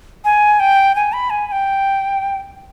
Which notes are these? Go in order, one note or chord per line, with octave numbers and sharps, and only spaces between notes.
G#5
G5
G#5
B5
G#5
G#5
G5